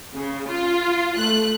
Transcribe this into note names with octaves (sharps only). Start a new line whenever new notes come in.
C#3
F4
A3 F#6